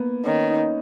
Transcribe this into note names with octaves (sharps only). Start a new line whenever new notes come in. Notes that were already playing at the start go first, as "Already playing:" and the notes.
Already playing: A#3 B3
D#3 C#4
D#4